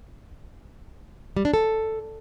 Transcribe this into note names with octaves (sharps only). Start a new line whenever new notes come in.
G3
D4
A4